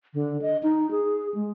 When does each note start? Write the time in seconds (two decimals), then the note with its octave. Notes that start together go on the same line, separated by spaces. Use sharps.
0.14 D3
0.42 D#5
0.63 D#4
0.91 G#4
1.34 G#3